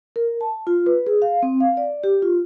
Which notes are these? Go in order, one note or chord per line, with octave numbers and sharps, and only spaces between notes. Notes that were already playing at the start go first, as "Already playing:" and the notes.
A#4
A5
F4
B4
G#4
F5
C4
F5
D5
G4
F4